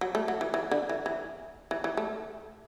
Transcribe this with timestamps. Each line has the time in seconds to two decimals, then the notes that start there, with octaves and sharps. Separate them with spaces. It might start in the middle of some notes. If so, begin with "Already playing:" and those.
0.01 F#3
0.15 A3
0.28 F#3
0.41 E3
0.54 E3
0.71 D3
0.89 E3
1.06 E3
1.71 E3
1.84 E3
1.97 A3